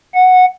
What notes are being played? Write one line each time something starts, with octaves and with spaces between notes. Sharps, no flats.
F#5